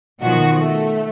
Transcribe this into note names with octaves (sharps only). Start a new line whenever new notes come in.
B2 D#3 F3 F#4
A3